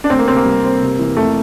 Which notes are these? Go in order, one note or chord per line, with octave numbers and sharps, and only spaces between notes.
D4
D2 C4
A#3
C3 C4
A#3
G3
C4
C3
E3
F2 A3